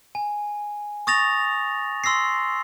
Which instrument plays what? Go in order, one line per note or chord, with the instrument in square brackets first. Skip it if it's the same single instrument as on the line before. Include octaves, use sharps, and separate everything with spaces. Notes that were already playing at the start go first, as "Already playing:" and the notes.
[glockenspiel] G#5
C#6 D#6 A6 A#6 F7
C6 E6 A#6 C7